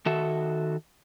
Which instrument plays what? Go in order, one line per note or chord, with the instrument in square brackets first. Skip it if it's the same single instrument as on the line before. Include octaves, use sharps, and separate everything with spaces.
[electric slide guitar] D#3 F#4 A4 E5